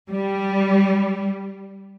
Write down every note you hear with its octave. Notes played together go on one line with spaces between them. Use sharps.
G3